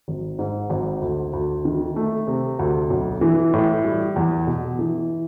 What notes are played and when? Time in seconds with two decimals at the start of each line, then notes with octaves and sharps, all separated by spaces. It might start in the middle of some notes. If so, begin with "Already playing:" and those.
0.08 G#1
0.39 G#2
0.70 G#1
1.01 D2
1.33 D2
1.65 D#3
1.96 A3
2.27 C3
2.59 D2
2.90 B1
3.21 E3
3.53 A2
3.84 G3
4.16 E2
4.47 B2
4.79 E3